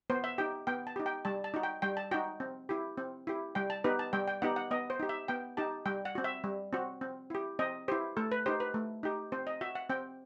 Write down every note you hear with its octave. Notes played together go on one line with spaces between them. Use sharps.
B3 C5
E5
D#4 G4 G5
B3 G5
A5
D#4 G4
G5
G3 A5
A5
D#4 F#4
G5
G3 G5
A5
D#4 F#4 G5
C4
E4 G4
C4
E4 G4
G3 G5
A5
B3 D#4 G4 B4
A5
G3 G5
G5
B3 D#4 G4 F#5
F#5
B3 D#5
C5
D#4 G4
E5
B3 G5
D#4 G4 A5
G3 G5
F#5
C4 F#4
E5
G3
C4 F#4
C4
E4 G4
C4 D#5
E4 G4 C5
A3 A4
B4
D#4 G4 C5
B4
A3
D#4 G4
C4 C5
D#5
F#4 E5
F#5
C4 G5